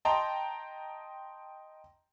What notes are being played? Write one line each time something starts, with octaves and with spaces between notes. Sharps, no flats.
D#5 G5 A5 A#5 C6